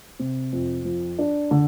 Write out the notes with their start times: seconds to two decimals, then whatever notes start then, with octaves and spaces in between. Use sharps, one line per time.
0.19 C3
0.52 F2
0.85 F3
1.19 D4
1.51 D3